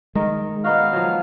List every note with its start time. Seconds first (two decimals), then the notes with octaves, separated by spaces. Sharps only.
0.15 D#3 G#3 A#4
0.64 B3 D#4 F#4 F5
0.93 F3 F#3